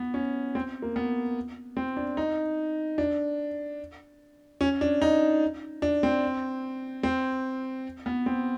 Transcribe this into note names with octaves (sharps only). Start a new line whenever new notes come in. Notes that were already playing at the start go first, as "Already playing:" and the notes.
Already playing: B3
C#4
C4
A#3
B3
C4
D4
D#4
D4
C#4
D4
D#4
D4
C4
C4
B3
C4